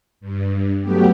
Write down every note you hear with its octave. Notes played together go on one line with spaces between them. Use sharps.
G2
F#3 A3 B3 G4